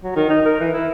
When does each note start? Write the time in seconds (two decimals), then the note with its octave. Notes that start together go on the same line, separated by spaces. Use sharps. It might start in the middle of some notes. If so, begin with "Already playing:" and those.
0.04 F#3
0.16 D#3
0.30 D#4
0.45 A#4
0.60 E3
0.73 E4